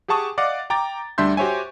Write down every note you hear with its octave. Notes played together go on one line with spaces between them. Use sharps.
G4 G#4 F#5 A5 C#6 D#6
D5 D#5 F5 F#5 D6
G5 A#5 D6 A6
D2 G3 D4 E5 C6 G6
F#4 G4 C5 C#5 E5 G#5